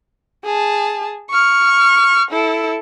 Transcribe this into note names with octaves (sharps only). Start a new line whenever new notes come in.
G#4 A5
C#6 F6
E4 A4